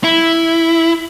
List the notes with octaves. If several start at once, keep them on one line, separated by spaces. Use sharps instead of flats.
E4